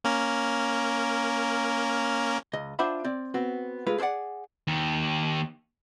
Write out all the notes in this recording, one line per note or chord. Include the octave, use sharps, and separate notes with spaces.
A#3 C#4 A#4
C#2 D#5
D4 F4 C5 E5 F#5 B5
C4 D5
B3 C4 F#4
G#3 A3 F4 B4
G#4 A4 C5 D5 F#5
D#2 D#3